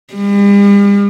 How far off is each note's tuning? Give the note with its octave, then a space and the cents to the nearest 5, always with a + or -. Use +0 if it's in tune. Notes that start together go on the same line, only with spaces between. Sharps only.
G3 +45